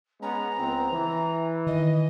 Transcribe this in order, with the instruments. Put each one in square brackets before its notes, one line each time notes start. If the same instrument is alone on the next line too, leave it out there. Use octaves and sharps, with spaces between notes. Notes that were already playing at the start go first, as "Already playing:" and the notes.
[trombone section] G#3 B3 C#4 [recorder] A#5
[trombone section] C#2 B3 C4
E3
[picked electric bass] D#3 [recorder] D#5